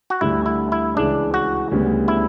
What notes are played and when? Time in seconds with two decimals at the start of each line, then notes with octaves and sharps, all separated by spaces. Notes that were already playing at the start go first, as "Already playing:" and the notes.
0.10 F#4
0.21 D2 D3 G3 E4
0.46 E4
0.72 E4
0.96 C#2 C#3 E3 D4
1.34 F#4
1.71 D2 C#3 G3 B3
2.08 E4